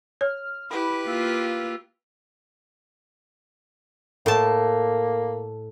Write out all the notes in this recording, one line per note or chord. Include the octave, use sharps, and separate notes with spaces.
C#5 F6
E4 G4 B4 B5
A#3 F4 E6
A2 A#3 A5